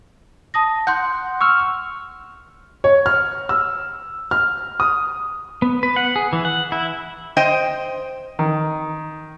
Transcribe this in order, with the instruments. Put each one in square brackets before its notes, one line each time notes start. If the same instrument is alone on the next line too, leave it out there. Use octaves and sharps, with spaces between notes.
[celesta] A5 D#6 A#6
[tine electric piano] F#5 [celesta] C6 F#6 G6
[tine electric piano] C#6 E6 F6
[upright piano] C#5
F6
E6
F6
D#6
[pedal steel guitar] B3
B4
F#5
G#4
E3
F#5
E4
[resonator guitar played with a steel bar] C5 D#5 G5
[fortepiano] D#3